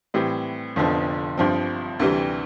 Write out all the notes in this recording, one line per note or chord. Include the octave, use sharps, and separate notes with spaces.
A2 E3 G3 C4
F1 F2 D3 F3 B3
G1 G2 F3 C4
D2 C3 E3 G3